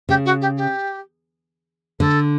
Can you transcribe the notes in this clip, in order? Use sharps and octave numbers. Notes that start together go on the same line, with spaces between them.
C#3 G4
F#4
G4
G4
D3 A4